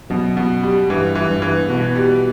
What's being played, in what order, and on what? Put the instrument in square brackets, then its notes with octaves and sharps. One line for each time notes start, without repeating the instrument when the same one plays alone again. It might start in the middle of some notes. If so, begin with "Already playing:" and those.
[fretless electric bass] F#2 [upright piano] B2
[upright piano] B2
G3
[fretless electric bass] G2 [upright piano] E3
[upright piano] E3
[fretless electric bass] G2
[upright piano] E3
[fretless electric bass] B2 [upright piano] F#4
[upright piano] G3